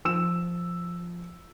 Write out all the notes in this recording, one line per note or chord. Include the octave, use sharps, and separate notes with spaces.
F3 E6 E7